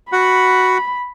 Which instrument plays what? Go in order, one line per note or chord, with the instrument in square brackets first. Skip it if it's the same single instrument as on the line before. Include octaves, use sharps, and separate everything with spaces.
[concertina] F#4 F#5 [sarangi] B5